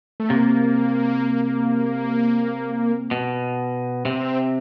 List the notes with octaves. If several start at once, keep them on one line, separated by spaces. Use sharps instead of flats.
A3
C3 A#3
B2
C3 C4